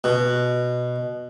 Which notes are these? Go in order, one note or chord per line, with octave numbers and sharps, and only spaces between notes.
B2